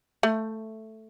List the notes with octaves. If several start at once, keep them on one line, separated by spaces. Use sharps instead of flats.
A3